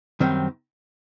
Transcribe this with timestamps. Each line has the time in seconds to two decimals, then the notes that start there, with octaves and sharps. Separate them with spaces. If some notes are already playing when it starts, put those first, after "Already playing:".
0.20 F#2 D#3 G3 C4